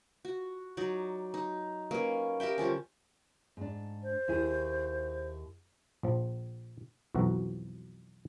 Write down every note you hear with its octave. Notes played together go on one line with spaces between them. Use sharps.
F#4
F#3 D#4 D5
D#4
A#3 C#4 B4
G4 A#4 E5 G5
D3 F3 G3 C#4
G#2 D4
C5
D#2 E4 G#4
A#1 F3
B1 F2 E3 F#4 A#5